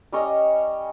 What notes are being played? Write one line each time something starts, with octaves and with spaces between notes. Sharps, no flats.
G3 C#4 C#5 D#5